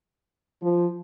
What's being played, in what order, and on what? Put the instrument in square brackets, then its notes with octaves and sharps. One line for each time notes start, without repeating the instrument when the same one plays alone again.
[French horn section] F3